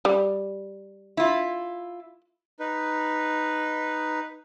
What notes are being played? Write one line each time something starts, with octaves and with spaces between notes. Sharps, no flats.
G3
E4 F4
D#4 B4